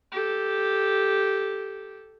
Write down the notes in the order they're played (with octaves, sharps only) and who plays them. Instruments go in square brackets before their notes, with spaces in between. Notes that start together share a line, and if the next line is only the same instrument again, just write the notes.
[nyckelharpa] G4 A4